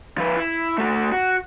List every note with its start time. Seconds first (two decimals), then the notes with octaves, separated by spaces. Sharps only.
0.18 F3 B4
0.36 E4
0.78 A3 F#4
1.12 F#4